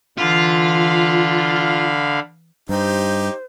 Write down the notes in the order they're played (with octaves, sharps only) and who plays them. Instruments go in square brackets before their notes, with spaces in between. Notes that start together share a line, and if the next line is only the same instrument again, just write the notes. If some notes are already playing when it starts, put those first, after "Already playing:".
[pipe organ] D3 F5 B5 [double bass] E3 [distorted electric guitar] F4
[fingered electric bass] G2 [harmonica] D#4 G4 [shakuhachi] C5